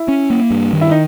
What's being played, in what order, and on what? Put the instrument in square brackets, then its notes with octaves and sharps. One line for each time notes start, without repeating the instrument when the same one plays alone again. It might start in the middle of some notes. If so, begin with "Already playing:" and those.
Already playing: [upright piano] E4
[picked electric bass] C#4
A#3
G2
D#3
[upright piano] E4
D#4